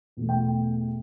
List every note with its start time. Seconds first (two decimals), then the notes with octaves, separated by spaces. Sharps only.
0.17 E2 B2 A3
0.29 G5